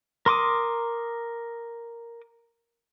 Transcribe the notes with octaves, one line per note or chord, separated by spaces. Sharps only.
A#4 C6 D6 D#6